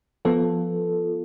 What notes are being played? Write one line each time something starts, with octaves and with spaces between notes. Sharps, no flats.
F3 B3 F4 A4